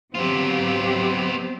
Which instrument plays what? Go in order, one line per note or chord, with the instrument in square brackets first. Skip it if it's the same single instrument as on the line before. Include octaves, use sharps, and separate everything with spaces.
[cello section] F#3 C4 G4 [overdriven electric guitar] B3 F4